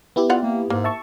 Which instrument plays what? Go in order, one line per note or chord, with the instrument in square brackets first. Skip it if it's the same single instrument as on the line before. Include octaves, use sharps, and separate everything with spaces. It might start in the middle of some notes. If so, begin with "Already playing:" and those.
[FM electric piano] B3 E4 G4
[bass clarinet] F4 [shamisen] D5 F5 F#5
[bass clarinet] A#3
[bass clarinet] G#2 [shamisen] A#3
[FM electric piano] E5 A5 C#6